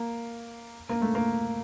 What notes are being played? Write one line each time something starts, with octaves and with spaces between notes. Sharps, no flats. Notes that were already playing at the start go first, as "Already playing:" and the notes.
Already playing: A#3
A#3
A3
A#3